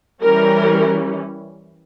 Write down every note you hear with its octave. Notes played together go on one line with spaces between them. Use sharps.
E3 G3 C#4 A#4